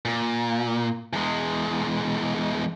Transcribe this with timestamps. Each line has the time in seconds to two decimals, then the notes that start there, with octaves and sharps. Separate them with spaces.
0.05 A#2
1.13 E2 G#3